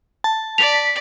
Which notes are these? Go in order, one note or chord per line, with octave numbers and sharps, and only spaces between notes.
A5
D5 B6 F7